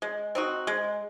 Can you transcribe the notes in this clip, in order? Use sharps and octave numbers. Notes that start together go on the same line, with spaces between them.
G#3
C4 D#4 F#4
G#3